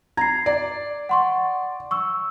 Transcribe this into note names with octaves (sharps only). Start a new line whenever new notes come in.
A#5 G#6 C7
D5
F#5 C6 C#6
C#6 E6